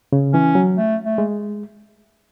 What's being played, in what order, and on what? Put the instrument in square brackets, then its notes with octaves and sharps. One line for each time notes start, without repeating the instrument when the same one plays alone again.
[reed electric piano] C#3
[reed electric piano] E3 [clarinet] C#4
[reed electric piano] F#3
[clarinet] A3
A3
[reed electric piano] G#3